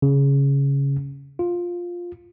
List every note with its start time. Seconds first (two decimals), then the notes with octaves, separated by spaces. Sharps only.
0.02 C#3
1.39 F4